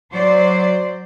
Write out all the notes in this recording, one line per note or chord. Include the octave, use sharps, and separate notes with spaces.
F#3 C5 D5